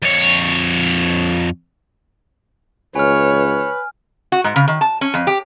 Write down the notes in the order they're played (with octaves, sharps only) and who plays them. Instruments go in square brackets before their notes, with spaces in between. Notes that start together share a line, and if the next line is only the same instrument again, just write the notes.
[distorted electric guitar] F2 C#5
[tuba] C#2 [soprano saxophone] B4 [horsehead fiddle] C#5 [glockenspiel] G#5 F6
[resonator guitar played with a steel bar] F#4
G#2
C#3
D#3
A5
C#4
F2
G4